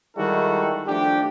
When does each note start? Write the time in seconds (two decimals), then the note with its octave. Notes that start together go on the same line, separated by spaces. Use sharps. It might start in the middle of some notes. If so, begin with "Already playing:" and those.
0.16 D#3 G3 G#3 E4 F#4 A4
0.87 F3 A3 D4 G4